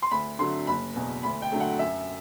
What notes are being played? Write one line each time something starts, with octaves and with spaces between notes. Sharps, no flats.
C6
D2 B5
D3 F#3 A3 C6
F#1 B5
E2 B2
D2 B5
G5
D3 F#3 A3
F#5
F#2 E5